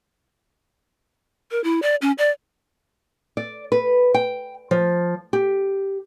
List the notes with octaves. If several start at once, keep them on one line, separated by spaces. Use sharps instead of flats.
A#4
E4
D5
C#4
D5
D5
B4
G5
F3
G4